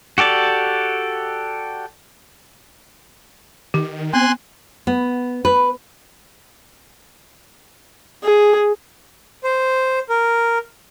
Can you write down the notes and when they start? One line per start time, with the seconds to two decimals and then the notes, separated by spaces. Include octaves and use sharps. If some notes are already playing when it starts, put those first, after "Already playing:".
0.18 F#4 G4 A4 D5
3.74 D#3 G4
4.14 B3 C4 G#5 C6 F#6
4.87 B3
5.45 B4
8.24 G#4
9.44 C5
10.09 A#4